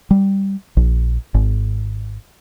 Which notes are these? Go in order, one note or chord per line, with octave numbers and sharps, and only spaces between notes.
G3
A#1
G#1